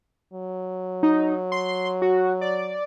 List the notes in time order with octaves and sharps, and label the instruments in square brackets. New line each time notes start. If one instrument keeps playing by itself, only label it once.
[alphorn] F#3
[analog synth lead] D#4
C6
F#4
D5